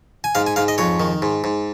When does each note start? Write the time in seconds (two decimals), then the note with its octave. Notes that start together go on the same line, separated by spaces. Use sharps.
0.24 G#5
0.35 G#2 F5
0.47 G#5
0.56 G#2 F5
0.68 D#5
0.78 F2 C#5
1.00 D#3
1.22 G#2
1.44 G#2